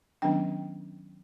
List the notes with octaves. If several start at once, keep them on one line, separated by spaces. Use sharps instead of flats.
D#3 F#3 B3 C#4 D4 G5